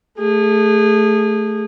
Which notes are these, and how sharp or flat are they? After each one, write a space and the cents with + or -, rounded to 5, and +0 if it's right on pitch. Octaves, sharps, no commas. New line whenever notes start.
A3 +0 G#4 -25